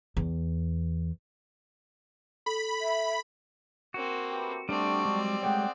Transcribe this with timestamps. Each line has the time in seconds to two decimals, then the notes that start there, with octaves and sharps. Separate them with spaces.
0.17 E2
2.46 A4 B5
2.81 E5
3.94 A#3 C4 F#4
4.30 A3 G4 B4
4.69 G3 A3 C4 D4 F#4 D5 A5 C#6
5.05 F#3 G#3
5.43 G#3 A3 G#4 C#5 F#5 G5